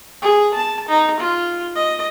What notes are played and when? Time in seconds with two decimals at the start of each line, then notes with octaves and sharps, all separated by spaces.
0.22 G#4
0.54 A5
0.89 D#4
1.20 F4
1.76 D#5